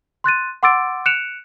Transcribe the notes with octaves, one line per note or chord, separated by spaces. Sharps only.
C6 F#6 A6 D#7
F#5 C6 D6 E6 A6 D7
F#6 C#7 D7 E7 F7